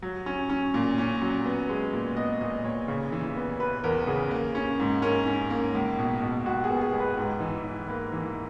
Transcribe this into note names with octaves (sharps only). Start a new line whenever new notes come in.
F#3
C#4
C#4
A#2
C#4
F#3
B3
G#3
A#2
B3 D#5
A#2 D#5
A#2 C#5
C#3
E3
B3
B3 B4
E2 A#4
C#3 G#4
A#3
C#4
G#2
C#4 A#4
C#4
A#3
C#2
B2
B2
C#2 F#4
G#4
B3
G#4
C#2
B4
G#2
E3
E3
A#3 B4
E3